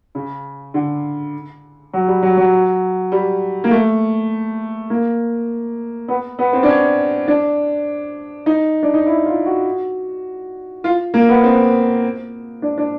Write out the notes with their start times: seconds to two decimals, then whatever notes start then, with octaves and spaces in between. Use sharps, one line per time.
0.15 C#3
0.74 D3
1.93 F#3
2.08 G3
2.23 F#3
2.37 F#3
3.12 G3
3.64 A#3
3.71 A3
4.90 A#3
6.08 B3
6.39 B3
6.53 C4
6.63 D4
6.68 C#4
7.28 D4
8.46 D#4
8.83 D4
8.94 D#4
9.06 E4
9.26 F4
9.46 F#4
10.84 F4
11.14 A#3
11.29 B3
11.44 C4
12.62 D4
12.78 D4